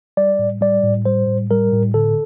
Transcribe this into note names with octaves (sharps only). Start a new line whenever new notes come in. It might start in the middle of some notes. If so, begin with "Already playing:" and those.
G3 D5
A2
G3 D5
A2
G3 C5
A2
G3 A#4
A2
D3 A4